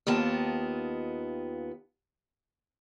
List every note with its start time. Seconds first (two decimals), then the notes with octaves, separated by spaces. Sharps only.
0.07 D#2 D#3 B3 F4 A5